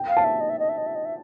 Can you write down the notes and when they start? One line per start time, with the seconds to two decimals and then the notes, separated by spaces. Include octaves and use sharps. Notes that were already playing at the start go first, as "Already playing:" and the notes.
Already playing: G5
0.08 F5
0.17 A5
0.24 E5
0.40 D#5
0.50 E5
0.59 D#5
0.69 E5
0.78 D#5
0.87 E5
0.95 D#5
1.05 E5